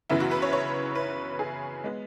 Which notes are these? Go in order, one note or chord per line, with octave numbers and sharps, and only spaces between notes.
F#2 C#3 E3 B3 E4
F#4
B4
C#5
C#5
B4
G#4
G#3 B3